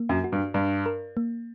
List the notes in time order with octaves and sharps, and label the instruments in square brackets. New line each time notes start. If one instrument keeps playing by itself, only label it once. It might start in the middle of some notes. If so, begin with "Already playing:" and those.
Already playing: [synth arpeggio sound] A#3
[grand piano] F#2
[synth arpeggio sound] F#4
[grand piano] G2
[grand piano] G2 [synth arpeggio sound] D4
[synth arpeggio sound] A#4
A#3